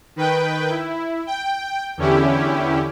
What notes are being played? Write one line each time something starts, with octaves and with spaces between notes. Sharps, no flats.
D#3 B4 G5
E4
G5
E2 D3 C#4 E4 G4